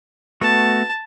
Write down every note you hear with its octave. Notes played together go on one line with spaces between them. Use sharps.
A3 B3 F#4 A5